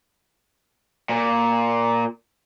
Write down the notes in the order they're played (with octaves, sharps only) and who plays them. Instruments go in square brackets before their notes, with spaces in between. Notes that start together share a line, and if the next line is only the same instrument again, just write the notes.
[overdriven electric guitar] A#2